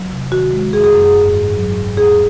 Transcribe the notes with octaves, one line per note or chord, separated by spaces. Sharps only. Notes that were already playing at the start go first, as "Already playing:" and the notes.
Already playing: F#3
C3
D#3 F#4
G#3
F#2 G#4
G#4
F#2
G#4
G#2
G#2
F#3
G#2
E2 G#4